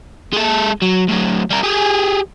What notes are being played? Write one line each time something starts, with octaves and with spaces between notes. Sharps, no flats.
G#3 A4
F#3
A2 F#3
G3 A#4
G4 G#4